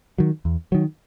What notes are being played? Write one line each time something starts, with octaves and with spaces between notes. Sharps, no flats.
D#3 F#3
E2
D#3 F#3